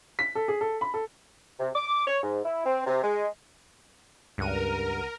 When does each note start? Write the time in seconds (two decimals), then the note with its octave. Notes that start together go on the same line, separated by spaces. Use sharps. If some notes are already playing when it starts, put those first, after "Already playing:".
0.19 B6
0.35 A4
0.48 G#4
0.61 A4
0.81 B5
0.94 A4
1.60 C3
1.75 D6
2.07 C#5
2.22 G#2
2.45 E4
2.65 C4
2.87 C3
3.03 G#3
4.38 C#2 G2 A#4 F#5 D#7